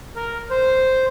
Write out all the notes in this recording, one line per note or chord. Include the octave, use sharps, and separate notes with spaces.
A#4
C5